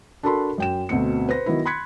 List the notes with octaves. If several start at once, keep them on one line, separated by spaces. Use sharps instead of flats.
D4 F#4 A4 A#4 B5 C6
F#2 G5 E7
D2 B2 C4 C#7
B4 C5 A#6
D#3 F#3 B3 E4
B5 C6 F#6 G#6 B6 C#7